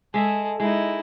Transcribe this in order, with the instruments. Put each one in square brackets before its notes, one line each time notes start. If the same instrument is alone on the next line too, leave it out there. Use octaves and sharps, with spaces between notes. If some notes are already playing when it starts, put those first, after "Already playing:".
[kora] G#3 E5 [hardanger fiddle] G#4 A4
[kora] G#3 [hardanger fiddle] D#4 E4